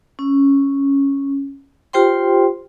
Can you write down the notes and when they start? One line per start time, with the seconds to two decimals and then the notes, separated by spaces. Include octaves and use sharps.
0.19 C#4
1.93 F4 G4 C5 G5 C6